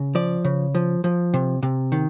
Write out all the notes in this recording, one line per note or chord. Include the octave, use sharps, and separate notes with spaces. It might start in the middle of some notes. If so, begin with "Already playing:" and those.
Already playing: C#3
F3 D5
C#3
F3
F3
C3
C3
D#3